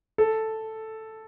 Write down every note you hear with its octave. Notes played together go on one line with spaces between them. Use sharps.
A4